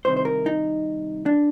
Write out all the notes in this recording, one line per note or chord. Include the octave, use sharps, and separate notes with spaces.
C2 C3 D#3 C5
C5
A#4
D#4
D4